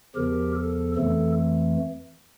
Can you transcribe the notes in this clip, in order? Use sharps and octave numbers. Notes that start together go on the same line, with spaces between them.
E2 C#3 F3 G4 A#4
A4
F2 E3 A3 A4